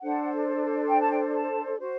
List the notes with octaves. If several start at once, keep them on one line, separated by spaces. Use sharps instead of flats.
D4 A4 C5 F#5
G5
A5
G5
A5
F#4 C5